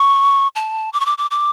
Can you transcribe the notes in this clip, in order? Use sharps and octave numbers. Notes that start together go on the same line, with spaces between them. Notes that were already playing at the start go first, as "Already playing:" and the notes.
Already playing: C#6
A5
D6
C#6
D6
D6
D6